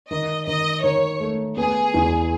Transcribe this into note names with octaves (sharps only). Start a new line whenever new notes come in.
D#3 D#5
D#3 D#5
D#3 C#5
A3
B3 G#4
E2